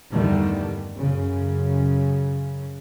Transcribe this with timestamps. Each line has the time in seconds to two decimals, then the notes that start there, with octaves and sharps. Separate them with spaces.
0.14 E2 G2 D3 D#3 G3 A3
0.96 F#2 C#3